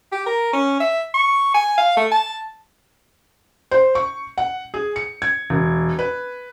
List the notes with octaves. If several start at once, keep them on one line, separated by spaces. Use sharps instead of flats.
G4
A#4
C#4
E5
C#6
G#5
F5
A3
A5
C5
C#6
F#5
G#4
C#7
G#6
E1
B4